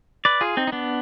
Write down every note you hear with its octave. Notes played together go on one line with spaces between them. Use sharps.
B4 D5
F4 G#4
C4 D#4
D#4
B3 D4